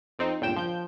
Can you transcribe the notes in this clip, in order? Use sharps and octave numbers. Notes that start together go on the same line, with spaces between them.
F2 C4 D#4
G1 C#2 A#2 G5 E7
F3 G6